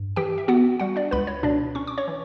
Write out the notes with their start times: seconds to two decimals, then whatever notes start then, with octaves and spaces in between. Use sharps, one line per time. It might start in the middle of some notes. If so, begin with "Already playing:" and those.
Already playing: G2
0.16 E3 G4 G5
0.38 E5
0.48 B3 F#4 F#5
0.80 G3 F#4 F#5
0.96 D4 D5
1.11 C#2 B4 B5
1.27 C#5
1.43 B2 D4 D5
1.75 C#4 C#6
1.87 D6
1.98 C#5 C#6
2.08 E3